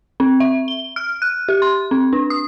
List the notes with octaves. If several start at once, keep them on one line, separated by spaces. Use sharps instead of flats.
C4
E5
G7
F6
F#6
G4
C6
C4
D4
D#6